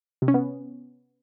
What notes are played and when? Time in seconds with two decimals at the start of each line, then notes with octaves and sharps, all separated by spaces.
0.22 C3
0.28 C#4
0.34 B3